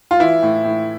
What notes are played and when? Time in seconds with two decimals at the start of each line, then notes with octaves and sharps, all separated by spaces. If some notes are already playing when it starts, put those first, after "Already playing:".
0.11 F4
0.20 E3 E4
0.43 A2
0.64 A2